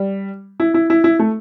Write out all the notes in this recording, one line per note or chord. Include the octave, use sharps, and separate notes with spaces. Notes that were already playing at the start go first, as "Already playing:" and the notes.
Already playing: G3
E4
E4
E4
E4
A3